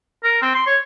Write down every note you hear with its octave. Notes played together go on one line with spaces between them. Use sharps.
A#4
C4
C6
C#5